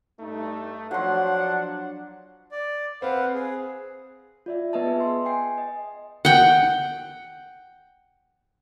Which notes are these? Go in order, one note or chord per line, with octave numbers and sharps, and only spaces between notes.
G2 A3 D#4
F3 F#3 D4 F#5 C6
D5
C4 B4 F5 F#5
G#4
F4 D5 E5
B3 B4 D#5 E5 A5
G#4
C6
G5 G#5 C7
D#5
F#5 G5